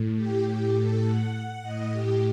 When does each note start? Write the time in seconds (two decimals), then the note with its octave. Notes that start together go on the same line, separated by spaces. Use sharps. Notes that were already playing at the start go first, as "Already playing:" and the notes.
Already playing: A2
0.16 G4
0.45 G4
0.75 A4
1.04 F#5
1.63 A2 D#5
1.92 G4